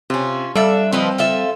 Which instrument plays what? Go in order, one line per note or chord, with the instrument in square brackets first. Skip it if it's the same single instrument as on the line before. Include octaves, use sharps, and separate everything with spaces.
[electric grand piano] C3 [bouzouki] C#4 F4
[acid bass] G3 [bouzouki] D4 E5 [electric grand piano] A4 F5
[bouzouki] F3 B4 D#5 [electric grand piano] C4
[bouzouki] F4 A4 E5